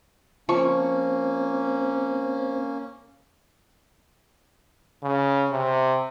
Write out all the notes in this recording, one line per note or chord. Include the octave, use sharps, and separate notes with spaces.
F3 A#3 C4 C#4 C#6
C#3
C3